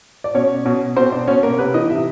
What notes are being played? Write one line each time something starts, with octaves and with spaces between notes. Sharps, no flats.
D5
B2 C#4 C#5
B2
B2 C4 C5
D4 D5
B2 C#4 C#5
A#3 A#4
C3 B3 B4
E3 D#4 D#5
C3 E4 E5